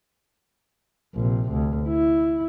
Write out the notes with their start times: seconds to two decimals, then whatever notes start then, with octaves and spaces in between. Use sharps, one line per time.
1.15 A#1 C3
1.52 D2
1.88 E4